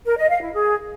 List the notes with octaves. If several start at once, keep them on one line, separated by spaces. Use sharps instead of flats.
A#4
D#5
F5
E4
G#4